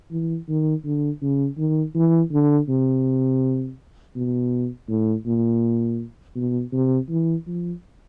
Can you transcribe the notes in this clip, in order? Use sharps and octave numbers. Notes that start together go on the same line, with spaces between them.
E3
D#3
D3
C#3
D#3
E3
D3
C3
B2
A2
A#2
B2
C3
E3
F3